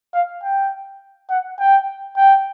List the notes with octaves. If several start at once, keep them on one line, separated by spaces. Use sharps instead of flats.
F5
G5
F#5
G5
G5